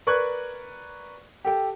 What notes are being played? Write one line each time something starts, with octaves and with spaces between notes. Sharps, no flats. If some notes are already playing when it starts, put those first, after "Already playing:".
A#4 B4 D5 C#6 F#6 G#6
G4 A4 G5